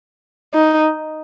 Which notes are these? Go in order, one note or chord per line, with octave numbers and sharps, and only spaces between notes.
D#4